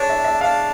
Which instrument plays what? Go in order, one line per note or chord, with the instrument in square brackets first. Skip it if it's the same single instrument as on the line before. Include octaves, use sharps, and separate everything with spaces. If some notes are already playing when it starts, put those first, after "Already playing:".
Already playing: [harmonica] D4 [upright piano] G#4 C#5
[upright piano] E5
E5
[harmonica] D4 [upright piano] F5